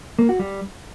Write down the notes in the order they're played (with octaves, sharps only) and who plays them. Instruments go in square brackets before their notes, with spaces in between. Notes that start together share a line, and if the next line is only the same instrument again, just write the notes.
[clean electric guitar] A#3
F#4
G3